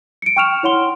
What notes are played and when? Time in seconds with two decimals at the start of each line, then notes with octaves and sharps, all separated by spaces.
0.22 C#7 D7
0.36 G5 C#6 F6 E7 F7
0.63 E4 C#5 F#5 C6 G7